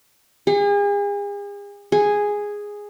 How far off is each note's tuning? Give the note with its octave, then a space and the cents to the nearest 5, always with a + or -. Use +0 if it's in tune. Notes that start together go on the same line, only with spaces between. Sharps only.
G#4 -40
G#4 -5